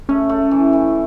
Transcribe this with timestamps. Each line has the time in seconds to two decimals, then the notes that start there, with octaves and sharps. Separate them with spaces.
0.09 A3 C#4
0.29 A3
0.51 E3
0.73 E3